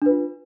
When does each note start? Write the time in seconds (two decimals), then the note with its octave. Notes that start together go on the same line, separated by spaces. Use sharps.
0.02 D4
0.06 B4
0.10 F4